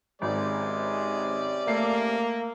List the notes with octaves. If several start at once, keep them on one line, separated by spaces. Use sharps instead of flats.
G#1 C3 G#3 C4 C#4 D5
A3 A#3 C7